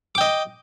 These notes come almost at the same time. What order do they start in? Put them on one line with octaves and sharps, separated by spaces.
D6 G5 D#5